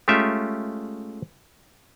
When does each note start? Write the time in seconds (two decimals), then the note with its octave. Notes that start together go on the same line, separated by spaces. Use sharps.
0.08 G#3 A3 C#4 F4 G4 E5